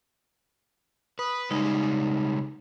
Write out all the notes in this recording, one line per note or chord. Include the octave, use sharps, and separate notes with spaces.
B4 D#6
C#3 G3 G#3 D#4